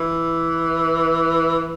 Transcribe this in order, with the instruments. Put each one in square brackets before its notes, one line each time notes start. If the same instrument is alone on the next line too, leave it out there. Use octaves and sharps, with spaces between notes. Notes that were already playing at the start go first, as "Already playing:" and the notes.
Already playing: [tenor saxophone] E3